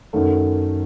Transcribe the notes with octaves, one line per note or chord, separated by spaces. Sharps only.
F#2 D#3 F#3 A3